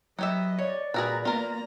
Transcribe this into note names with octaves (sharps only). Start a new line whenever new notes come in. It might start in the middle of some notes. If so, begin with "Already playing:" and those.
F#3 B3 G4 D#5 E5
C#5 D5
A#2 F#4 G#4 A#4 B4 A#5
A#3 B3 F4 A#4 A#5